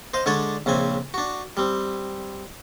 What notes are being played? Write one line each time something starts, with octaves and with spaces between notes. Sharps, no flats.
C5 D#5 F5
D3 G#3 D4 C#5 D5
A#1 C#3 C4 G#5
D4 F#4
G3 C4